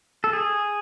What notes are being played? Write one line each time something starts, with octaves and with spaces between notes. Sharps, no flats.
A4
G#4